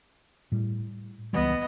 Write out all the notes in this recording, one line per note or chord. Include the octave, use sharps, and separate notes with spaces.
A2 G3
C#2 E3 G3 B3 D#5